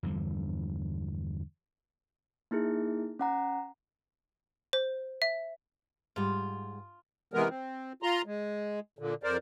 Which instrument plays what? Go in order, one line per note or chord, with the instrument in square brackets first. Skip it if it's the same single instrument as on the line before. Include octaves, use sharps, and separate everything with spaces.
[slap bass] E2 G2 D3 F3
[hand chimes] A#3 D#4 E4 G#4
C#4 F#5 A#5
[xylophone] C5
E5
[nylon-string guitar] G#2 G3 [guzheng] F4
[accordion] C3 E3 G#3 B3 A#4
C4
F4 A#5 C6
G#3
A#2 D3
F2 A#4 C5 D5